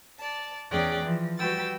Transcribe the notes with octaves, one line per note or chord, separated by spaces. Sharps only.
D5 A5
E2 C#4 G#4 D5 G5 F#6
E3 F3
G3 F#4 B4 G5 E6 A6